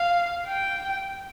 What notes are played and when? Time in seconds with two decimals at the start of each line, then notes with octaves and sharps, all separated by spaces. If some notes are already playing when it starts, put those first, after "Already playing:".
Already playing: F5
0.47 G5